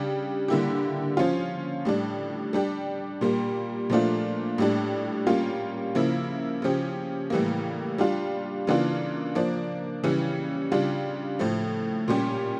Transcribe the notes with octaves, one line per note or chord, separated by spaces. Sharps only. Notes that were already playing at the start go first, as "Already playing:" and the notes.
Already playing: C#3 G3 D4 G4
D3 G3 A#3 E4 G4
F3 C#4 F4
A2 G3 D4
G3 D4 G4
A#2 G3 A#3
A#2 F3 A3 D4 F4
A2 G3 D4
G3 A#3 C#4 F4
C#3 F3 A#3 E4
C#3 F3 C#4 G4
A2 E3 G3 A#3
G3 D4 F4
C#3 E3 A#3 D4 F4
F3 A#3 D4
C#3 E3 G3 C#4
C#3 G3 D4 F4
A2 F3 A3
A#2 G3 C#4 G4